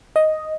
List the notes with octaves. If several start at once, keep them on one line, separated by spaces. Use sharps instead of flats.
D#5